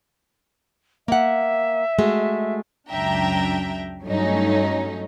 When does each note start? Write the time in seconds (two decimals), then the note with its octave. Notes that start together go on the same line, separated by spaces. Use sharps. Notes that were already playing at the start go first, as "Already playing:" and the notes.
1.08 A#3 E5 F#5
1.99 G#3 A3 F#4
2.90 C#2 F#2 D4 E5 G5 A#5
4.03 G2 F#3 A3 C#4 D#4